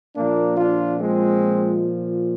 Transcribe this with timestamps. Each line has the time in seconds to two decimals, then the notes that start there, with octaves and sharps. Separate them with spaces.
0.15 A#2 F3 A#3 D4
0.57 D4 F4
0.99 G#3 C4